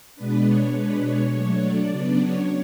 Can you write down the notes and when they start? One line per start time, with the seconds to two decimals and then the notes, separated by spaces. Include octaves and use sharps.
0.15 B2 G#3 B3 D4 B4
0.45 C#5
0.73 B2 G#3 D4 B4
1.03 C#5
1.32 F#3 A3 D4
1.62 D5
1.90 C#3 F#3 B3 D4 D5
2.19 C#5